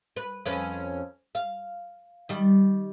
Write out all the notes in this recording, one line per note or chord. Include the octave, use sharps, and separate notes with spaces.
B4
F2 C#4 B4
F5
D#3 G3